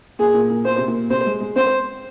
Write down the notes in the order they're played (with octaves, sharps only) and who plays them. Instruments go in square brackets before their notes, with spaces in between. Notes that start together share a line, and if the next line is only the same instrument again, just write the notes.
[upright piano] A#2 [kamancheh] G#4
[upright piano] A#2
A#2
[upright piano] A#2 [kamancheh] C5
[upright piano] C3
A#2
[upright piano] C3 [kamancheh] C5
[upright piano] G#3
G#3
[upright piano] C4 [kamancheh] C5